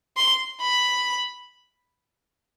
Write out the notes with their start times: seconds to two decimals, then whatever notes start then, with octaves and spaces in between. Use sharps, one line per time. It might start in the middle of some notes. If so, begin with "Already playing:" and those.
0.17 C6
0.61 B5